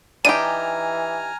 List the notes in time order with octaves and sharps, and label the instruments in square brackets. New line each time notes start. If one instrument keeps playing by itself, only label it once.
[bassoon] E3 [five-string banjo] D4 D#4 G4 [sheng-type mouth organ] G#5 A#5 F6 [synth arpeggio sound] D#7